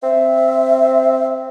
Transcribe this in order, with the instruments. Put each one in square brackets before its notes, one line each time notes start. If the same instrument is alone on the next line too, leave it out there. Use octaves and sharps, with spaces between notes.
[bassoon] C4 [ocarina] E5